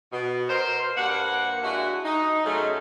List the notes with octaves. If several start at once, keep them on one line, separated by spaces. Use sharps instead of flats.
B2
A#4 C5 C6
G2 A#3 F#5
G#3 D4 E4 F#4
D#4
F#2 C#3 F#3 G#3 A3